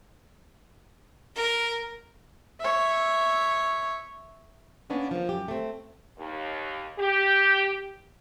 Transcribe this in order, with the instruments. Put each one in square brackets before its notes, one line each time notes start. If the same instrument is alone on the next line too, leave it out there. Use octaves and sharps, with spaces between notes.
[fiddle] A#4
[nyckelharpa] C#5 E5
[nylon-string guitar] A#3 B3 C#4 D4
F3 A#3
F#2 G4
A3 C4
[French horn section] D#2
G4